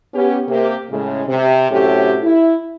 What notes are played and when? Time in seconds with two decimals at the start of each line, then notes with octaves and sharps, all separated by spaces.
0.14 B3 C#4 G4
0.48 C3 A#3 G4
0.91 A2 C#3 G#3
1.28 C3
1.71 A2 C3 F#3 A3 C#4 G4
2.23 E4